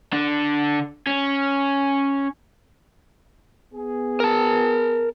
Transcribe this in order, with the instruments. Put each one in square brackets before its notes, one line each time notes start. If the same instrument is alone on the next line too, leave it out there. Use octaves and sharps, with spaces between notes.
[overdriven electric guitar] D3 D4
C#4
[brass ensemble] B3 G#4
[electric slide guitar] A#4 A5